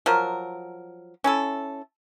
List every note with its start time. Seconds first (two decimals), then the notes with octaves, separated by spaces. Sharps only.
0.06 F3 F#3 A#4
1.24 C#4 E4 A4